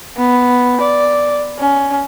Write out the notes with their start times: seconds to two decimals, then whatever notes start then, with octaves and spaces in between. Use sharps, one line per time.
0.17 B3
0.81 D5
1.58 C#4